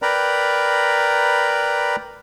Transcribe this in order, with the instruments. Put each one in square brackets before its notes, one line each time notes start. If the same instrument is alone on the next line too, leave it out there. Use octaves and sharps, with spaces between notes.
[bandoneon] A#4 B4 D5 G5 A#5 B5